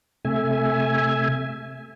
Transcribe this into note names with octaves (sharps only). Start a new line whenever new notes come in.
C3 A3 E5 G#5